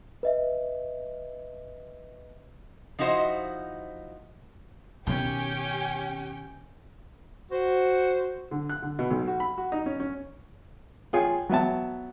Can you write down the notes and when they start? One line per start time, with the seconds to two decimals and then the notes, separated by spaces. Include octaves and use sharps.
0.23 B4 D#5 E5
2.99 F3 D#4 E4 F#4 C5 D#5
5.07 B2 D#3 C#4 G4 G5
7.50 F#4 C5
8.51 D3
8.69 F#6
8.82 D3
8.99 B2
9.11 B1
9.27 F#4
9.40 B5
9.58 F#4
9.72 D#4
9.86 C#4
10.00 C#4
11.13 F4 G#4 C#5 G5
11.49 F#3 B3 E5 A5